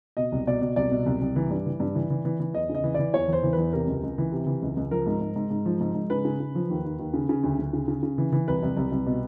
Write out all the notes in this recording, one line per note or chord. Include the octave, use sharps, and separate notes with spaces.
B2 D#5
C2
B2 D5
B2
C2 D5
B2
C2
C2
E3
G2
E3
G2
E3
E3
E3
E3
E2 D#5
C#3
D#5
E3
E3 D5
E2 C#5
E2 C5
E3
E2 B4
C3 A#4
C#2
C#2
E3
C3
E3
C#2
C#2
F3 A#4
G#2
G#2
G#2
G#2
F3
G#2
G#2
C#3 B4
C#3
C#3
F3
D#2
D#2
D#2
C#3
C#3
D2
D2
C#3
C#3
C#3
E3
E3
C2 B4
C2
C2
C2
B2